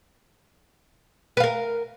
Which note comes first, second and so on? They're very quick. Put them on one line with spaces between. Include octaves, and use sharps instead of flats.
B4 F5 A#4